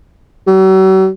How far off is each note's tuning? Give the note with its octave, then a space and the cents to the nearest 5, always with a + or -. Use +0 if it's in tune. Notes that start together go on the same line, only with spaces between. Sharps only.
F#3 +45